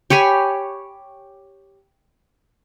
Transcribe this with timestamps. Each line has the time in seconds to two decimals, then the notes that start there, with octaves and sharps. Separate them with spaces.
0.10 G4 C#5 G#5 B5